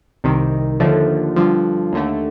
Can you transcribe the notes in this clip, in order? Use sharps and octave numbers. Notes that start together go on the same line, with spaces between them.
C2 C3 D#3
D#2 D3 F3 A3
G2 D3 F3
D#2 D3 A3